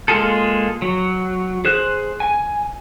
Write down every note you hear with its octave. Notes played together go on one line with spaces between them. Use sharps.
G#3 A#3 F4 G#4 A4
F#3
G#4 C5 F#6
G#5